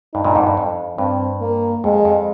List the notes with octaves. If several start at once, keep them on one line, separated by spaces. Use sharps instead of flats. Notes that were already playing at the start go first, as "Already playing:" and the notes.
G2 D#4
G2 A#2
F2 G#2
G2
F2
G2 C4
A#3
F2 G#3
F2